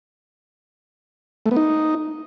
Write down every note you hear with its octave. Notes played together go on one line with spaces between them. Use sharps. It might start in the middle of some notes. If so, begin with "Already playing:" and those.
A3
B3
D#4